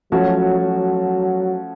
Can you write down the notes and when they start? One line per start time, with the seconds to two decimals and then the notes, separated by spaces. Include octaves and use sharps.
0.12 F3 F#3 A3 C#4 F#4
0.60 F#3